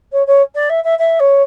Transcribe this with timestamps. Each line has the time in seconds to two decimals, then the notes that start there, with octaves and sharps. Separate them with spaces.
0.12 C#5
0.26 C#5
0.54 D5
0.69 E5
0.83 E5
0.98 E5
1.19 C#5